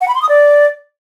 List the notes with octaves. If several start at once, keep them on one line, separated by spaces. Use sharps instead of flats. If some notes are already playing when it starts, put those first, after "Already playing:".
F#5
B5
C6
D#6
D5